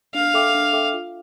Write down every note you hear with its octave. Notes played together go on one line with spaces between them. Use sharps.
D4 F5
A4 E5 G5 D6
D4
A4 E5 G5 D6
F4